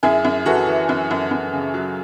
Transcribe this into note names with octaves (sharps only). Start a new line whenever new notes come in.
F#2 E4 G#4
F#2
E3 F#4 A4
E3
F#2
F#2
F#2
C#3
F#3